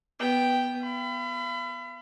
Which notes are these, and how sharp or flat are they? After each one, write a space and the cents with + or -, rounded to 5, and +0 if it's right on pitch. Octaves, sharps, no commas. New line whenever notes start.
B3 +0 G5 +0
F5 -40 B5 +30